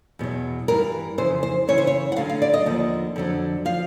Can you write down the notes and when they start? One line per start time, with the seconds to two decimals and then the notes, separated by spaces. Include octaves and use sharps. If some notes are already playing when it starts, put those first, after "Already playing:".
0.19 E2 B2 F#3
0.68 G2 E3 A#4
1.18 F2 C#3 E3 C5
1.43 C5
1.68 F#2 C#3 E3 C#5
1.78 C5
1.87 C#5
2.12 F#5
2.16 D2 D3 F#3 F5
2.30 F5
2.42 D5
2.54 D#5
2.66 D#2 D3 F3
3.16 F2 D3 F#3
3.65 F3 F5